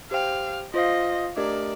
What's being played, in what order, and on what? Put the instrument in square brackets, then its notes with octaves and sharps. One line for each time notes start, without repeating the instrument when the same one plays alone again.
[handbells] G4 C5 G5 [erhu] F5
[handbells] F4 C5 F5 [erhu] D#5
[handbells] A3 D4 G4 A#4 D#5 [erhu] D5